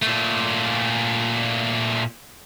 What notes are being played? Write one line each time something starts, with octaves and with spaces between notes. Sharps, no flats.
A#2 A3